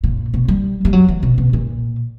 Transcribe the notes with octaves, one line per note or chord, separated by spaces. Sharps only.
A#2
B2
G3
G3
F#3
E3
B2
B2
A#2